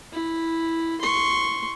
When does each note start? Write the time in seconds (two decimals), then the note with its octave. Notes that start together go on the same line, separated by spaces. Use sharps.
0.13 E4
1.01 C6 C#6